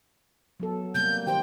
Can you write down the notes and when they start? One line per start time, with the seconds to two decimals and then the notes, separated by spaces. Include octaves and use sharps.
0.60 F#3 B3 A4
0.94 C3 G3 A#3 G6
1.27 D#3 G4 C5 G5